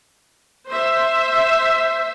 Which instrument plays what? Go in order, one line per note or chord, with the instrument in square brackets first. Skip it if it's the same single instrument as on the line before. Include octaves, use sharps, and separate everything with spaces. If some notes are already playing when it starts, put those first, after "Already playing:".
[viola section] C5 E5